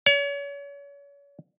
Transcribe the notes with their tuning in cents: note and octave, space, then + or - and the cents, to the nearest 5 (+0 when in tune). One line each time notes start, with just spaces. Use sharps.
C#5 +35